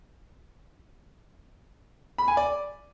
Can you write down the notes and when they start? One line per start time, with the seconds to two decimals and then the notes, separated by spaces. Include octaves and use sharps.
2.18 B5
2.28 G#5
2.37 D5